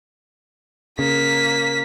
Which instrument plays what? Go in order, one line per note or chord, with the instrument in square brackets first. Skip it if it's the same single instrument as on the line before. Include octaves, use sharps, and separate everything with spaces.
[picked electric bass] C#3 [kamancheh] A#3 [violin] B6